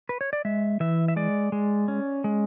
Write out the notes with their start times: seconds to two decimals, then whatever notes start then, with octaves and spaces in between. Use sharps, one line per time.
0.09 B4
0.21 C#5
0.33 D5
0.45 G#3 E5
0.80 E3 E5
1.08 E5
1.16 G#3 D5
1.52 G#3
1.88 C#4
2.24 G#3